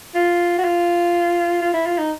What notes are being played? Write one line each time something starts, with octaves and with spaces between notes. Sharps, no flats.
F4
F#4
F4
F4
E4
F4
D#4